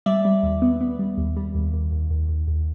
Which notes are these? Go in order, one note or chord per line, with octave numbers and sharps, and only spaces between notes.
G3 D5 E5
G3
D#2
B3
B3
G3
D#2
G3
D#2
D#2
D#2
D#2
D#2
D#2